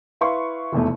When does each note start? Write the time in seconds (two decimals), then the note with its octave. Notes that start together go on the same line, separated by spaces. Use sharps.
0.21 E4 B4 F5 C6 C#6
0.73 F1 E2 B2 A3